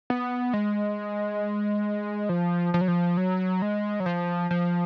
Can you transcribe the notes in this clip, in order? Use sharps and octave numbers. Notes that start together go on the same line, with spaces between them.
B3
G#3
F3
F3
F#3
F3
F#3
G#3
F#3
F3
F3